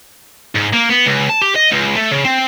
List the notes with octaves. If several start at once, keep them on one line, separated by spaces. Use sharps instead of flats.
G#2
A#3
B3
C#2
A5
G4
D#5
C#2
A3
C#3
C4